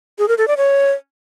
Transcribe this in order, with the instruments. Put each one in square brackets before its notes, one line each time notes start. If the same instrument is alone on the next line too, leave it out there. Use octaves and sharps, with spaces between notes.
[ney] G#4
A#4
A4
D5
C#5